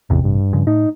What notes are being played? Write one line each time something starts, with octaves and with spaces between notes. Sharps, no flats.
A1 E2 C3
G2
G2
C#3 F3
A2 D#4